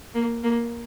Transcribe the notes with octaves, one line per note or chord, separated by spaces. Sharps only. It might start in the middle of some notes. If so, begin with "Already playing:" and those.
A#3
A#3